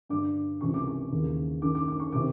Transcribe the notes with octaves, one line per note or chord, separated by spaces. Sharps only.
G2 D3 D6
C#2 C3 E3 C#6
D6
C#6
D#2 C#3 E3
F#2 D#3 D6
D6
D6
C#6
C3 D#3 D6